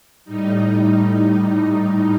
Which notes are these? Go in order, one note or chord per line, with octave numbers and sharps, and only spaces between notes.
A2 G3 D#4